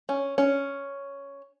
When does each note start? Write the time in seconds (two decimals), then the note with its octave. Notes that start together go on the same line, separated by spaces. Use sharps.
0.09 C#4
0.38 C#4